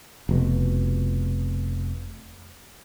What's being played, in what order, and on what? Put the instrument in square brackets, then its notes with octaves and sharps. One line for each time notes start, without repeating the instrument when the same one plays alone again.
[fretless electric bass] F1 B2